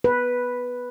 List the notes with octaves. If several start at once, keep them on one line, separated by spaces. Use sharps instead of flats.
B4